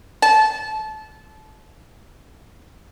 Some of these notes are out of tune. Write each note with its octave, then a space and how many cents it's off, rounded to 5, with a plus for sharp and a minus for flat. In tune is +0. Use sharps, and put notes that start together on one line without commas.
A5 -25